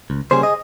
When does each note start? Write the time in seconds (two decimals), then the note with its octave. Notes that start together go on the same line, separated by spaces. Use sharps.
0.10 C#2
0.31 C#3 G3 A#3 C#4 G#4 C5
0.43 D#5